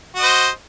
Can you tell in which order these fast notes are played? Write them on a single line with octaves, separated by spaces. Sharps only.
F#4 D#5 C5